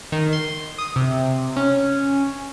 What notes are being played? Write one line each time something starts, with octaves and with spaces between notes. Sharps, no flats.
D#3
C6
D#6
C3
C#4